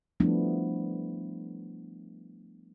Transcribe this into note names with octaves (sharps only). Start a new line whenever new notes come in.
F3 G3 A3 B3 D4 E4